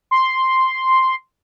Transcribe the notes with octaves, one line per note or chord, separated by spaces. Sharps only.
C6